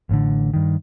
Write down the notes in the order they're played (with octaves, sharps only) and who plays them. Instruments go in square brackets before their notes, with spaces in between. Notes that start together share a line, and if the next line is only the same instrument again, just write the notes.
[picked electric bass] A1 A2 D3
G2 D#3